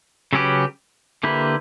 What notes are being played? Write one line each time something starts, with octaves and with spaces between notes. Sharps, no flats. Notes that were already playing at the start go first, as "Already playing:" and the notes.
C#3 F#3 C#4 G4 B4
D3 A#3 E4 G4 B4